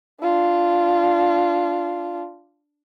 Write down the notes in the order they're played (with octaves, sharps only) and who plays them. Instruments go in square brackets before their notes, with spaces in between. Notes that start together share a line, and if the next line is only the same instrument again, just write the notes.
[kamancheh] D4 F4